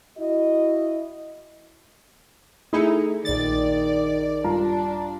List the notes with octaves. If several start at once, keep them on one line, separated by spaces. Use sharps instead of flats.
E4 F#4 D#5
A3 D#4 E4 G#4 C#7
A#1 D#3 D5 A6
G2 D4 F4 A#5